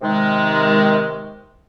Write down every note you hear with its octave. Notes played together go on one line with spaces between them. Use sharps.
C3 D#3 G#3